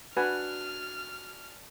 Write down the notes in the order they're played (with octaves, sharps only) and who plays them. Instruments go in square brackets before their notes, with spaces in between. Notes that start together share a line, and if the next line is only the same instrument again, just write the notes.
[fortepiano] D4 G#5 [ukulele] F#4 [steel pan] B4 [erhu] F6